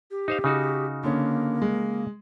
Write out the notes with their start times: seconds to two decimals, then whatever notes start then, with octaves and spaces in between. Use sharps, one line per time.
0.11 G4
0.28 D#4 C5 F5
0.44 C#3 D#4 F#4
1.04 D3 A#3 C#4
1.62 G#3